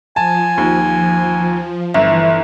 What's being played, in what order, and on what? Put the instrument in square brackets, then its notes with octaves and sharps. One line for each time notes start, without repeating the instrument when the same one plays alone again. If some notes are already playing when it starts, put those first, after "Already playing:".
[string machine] F3 [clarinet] G#5 [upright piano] A5
[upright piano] D#2
[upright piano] G1 [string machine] E3 [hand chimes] E5